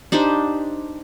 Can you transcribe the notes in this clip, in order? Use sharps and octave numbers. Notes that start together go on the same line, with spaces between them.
D4 D#4 G4 C5